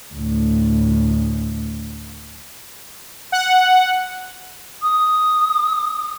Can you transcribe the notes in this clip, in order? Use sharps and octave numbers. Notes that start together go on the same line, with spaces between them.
D2 A2
F#5
D#6